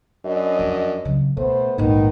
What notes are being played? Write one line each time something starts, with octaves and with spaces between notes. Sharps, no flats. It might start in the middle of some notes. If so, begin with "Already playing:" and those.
F#2 D4 D#5
F2
C#3 F#3
B2 A3 B3 C5
A#1 G#2 D#3 B3 D#4